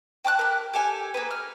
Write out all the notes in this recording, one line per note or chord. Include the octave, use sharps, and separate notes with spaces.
G5 A5 D6 F#6
G4 A#4
G4 A4 G#5
A#3 G#4 B4
F6